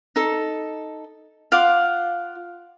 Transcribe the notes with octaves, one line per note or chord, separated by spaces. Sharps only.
D#4 A4
F4 F5 F#5 D6